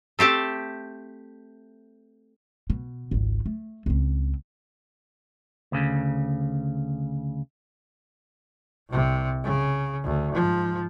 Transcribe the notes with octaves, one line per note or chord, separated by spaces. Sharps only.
A3 C4 G4 A5
B2
G#1 C#2
A3
C#2 C4
D2 C#3
C2 C3
C#3
D2
G#2 F3